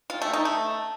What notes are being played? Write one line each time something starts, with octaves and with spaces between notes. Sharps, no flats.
F4
A3
D#4
A3